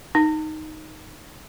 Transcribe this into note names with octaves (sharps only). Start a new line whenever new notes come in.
D#4